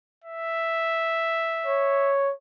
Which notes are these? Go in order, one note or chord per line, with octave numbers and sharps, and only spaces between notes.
E5
C#5